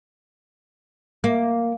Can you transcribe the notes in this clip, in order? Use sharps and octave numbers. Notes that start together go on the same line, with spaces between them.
A#3